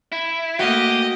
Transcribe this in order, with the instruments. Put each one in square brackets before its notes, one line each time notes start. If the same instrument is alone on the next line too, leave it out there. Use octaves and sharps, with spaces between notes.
[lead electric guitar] E4
[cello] A3 A#3 [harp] F#4 F5 [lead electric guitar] G4 [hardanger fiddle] D#5